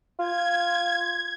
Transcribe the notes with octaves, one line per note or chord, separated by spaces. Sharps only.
F4 G#6